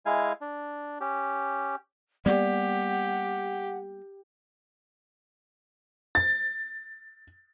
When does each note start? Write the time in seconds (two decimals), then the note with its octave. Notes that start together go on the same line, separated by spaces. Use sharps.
0.06 G#3 E4 F5 G#5
0.41 D4
1.01 C#4 G4
2.26 G3 A#3 B3 G4 D5 F#5
6.15 A6